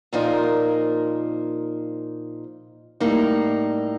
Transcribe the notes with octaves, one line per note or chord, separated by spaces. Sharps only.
A#2 F3 A#3 D#4 A#4
A2 G3 A#3 D#4